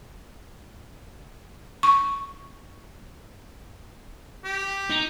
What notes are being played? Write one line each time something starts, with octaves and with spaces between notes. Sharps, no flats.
C#6
G4
D#4